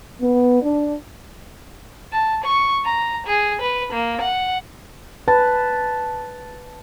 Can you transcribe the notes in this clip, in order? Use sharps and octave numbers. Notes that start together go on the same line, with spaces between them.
B3
D4
A5
C#6
A#5
G#4
B4
A#3
F#5
B4 A5